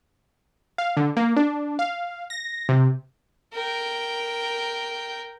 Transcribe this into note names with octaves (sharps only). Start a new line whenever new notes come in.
F5
D3
A#3
D4
F5
A#6
C3
A#4 G5